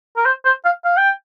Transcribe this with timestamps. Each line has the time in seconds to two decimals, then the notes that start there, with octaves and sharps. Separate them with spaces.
0.17 A#4
0.25 C5
0.45 C5
0.65 F5
0.85 F5
0.97 G5